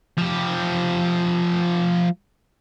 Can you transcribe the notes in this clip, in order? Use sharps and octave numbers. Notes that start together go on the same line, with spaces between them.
F3 G4